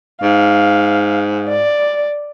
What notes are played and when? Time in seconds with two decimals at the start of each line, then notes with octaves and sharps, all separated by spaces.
0.22 G#2 F5
1.49 D5